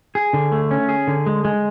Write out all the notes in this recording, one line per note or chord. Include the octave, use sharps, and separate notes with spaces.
G#4
D3
A3
C#4
G#4
D3
G#3
G#3